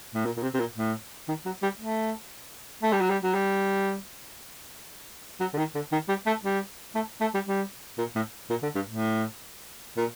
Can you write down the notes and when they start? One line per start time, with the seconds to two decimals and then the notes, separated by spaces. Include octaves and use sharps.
0.14 A2
0.25 A#2
0.37 A#2
0.42 C3
0.54 C3
0.60 A#2
0.77 A2
1.28 D#3
1.46 F#3
1.63 G3
1.80 A3
2.83 A3
2.92 G3
3.01 F#3
3.10 G3
3.23 F#3
3.35 G3
5.40 F#3
5.54 D3
5.58 D#3
5.75 D3
5.92 D#3
6.09 G3
6.26 A3
6.43 G3
6.95 A3
7.21 A3
7.34 G3
7.47 G3
7.98 A#2
8.15 A2
8.50 A#2
8.63 D3
8.75 G2
8.89 A2
9.97 A#2